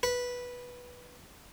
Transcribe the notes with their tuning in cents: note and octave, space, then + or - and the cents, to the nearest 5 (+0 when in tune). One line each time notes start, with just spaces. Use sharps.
B4 -10